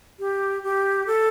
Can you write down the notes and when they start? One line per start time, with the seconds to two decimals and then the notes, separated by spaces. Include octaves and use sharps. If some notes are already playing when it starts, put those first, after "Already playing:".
0.19 G4
0.63 G4
1.07 A4